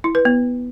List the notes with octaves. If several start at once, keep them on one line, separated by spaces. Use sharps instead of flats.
E4
B4
B3